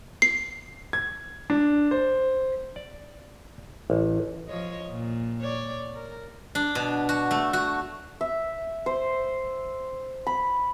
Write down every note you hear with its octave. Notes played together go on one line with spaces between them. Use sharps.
C7
G#6
D4
C5
D5
A1
F3 C#5 D#5
A#2
C#5 D5
A#4
D4
B2
F#4
A3
F#4
E5
C5
B5